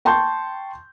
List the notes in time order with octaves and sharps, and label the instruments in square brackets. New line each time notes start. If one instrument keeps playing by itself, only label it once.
[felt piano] G5 A5 C6 C#6 G6